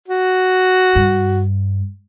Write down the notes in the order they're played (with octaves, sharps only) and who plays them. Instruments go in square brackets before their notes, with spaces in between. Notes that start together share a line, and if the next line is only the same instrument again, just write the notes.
[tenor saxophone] F#4
[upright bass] G2